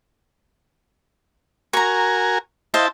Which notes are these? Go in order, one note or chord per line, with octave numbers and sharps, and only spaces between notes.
F#4 A#4 G#5 A#5 C#6
E4 C5 D#5 F5 A5